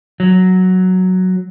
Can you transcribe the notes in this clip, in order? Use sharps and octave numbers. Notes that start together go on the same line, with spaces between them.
F#3